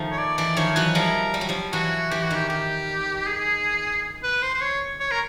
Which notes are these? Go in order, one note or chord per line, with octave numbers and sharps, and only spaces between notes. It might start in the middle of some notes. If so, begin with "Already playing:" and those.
Already playing: D#3 F3 A3
C#5
D5
E3 D5
D#3 F3 C#5
E3 F#3 B4
F3 G3 A#4
G3
F#3
F3 G3
E3 F#3 F#4
E3 G4
F#4
D#3 G4
D#3 G4
G#4
B4
C5
C5
C#5
C#5
A#4